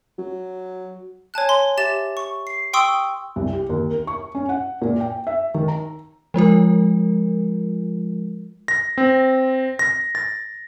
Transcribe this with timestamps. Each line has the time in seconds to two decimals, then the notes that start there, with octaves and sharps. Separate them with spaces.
0.18 F#3
1.34 C#5 G#5 A5 F#6
1.49 C6
1.77 G4 E5 A6 E7
2.17 C#6
2.47 C7
2.73 G5 C6 C#6 D#6 E6
3.36 C2
3.53 G4
3.69 D#2
3.91 A#4
4.07 C#6
4.35 C#4
4.49 F#5
4.82 A#2
5.00 G5
5.27 E5
5.55 D#3
5.68 A#5
6.34 F3 G#3 F4 A#4
8.68 A#6
8.98 C4
9.79 A#6
10.15 A6